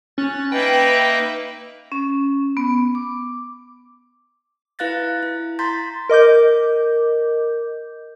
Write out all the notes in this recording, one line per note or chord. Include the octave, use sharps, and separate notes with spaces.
C#4 F#6 A6
A#3 D#4 B4 D#5 E5 G5
C#4
B3
D6
E4 B4 F5 F#6 A6 A#6
E4
A#5 C6 G6 A6 B6
A#4 D#5 D6 G6